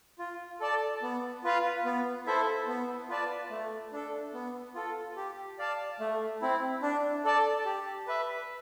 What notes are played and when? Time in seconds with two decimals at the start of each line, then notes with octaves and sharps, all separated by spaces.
0.19 F4
0.60 A4 D5 A5
1.02 B3
1.44 F4 B4 F5
1.85 B3
2.26 E4 A4 C5 E5
2.68 B3
3.09 F4 B4 D5 A5
3.51 A3
3.93 D4 A4
4.34 B3
4.75 F4 A4
5.16 G4
5.59 D5 F5 A5
6.00 A3
6.41 C4 E4
6.82 D4
7.25 A4 D5 A5
7.65 G4
8.07 B4 E5